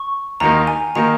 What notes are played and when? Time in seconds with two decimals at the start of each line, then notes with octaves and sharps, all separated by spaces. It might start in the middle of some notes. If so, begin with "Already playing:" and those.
Already playing: C#6
0.40 D#2 D#3 A#3 D#4 A#5
0.67 G#5
0.95 D#3 A#3 D#4 A#5